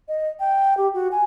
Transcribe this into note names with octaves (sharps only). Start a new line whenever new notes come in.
D#5
G5
G4
F#4
G#5